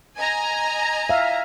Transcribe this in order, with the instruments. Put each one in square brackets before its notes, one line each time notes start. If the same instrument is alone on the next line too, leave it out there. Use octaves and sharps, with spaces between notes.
[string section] D#5 G#5 A#5
[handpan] E5 F5